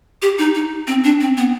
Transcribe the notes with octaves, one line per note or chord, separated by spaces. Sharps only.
G4
D#4
D#4
C4
D4
C4
B3